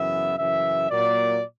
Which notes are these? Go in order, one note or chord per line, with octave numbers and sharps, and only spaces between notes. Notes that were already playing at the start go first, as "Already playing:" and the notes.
Already playing: F#2 C#3 E3 B3 E5
F#2 C#3 E3 E5
A#2 F#3 A#3 D5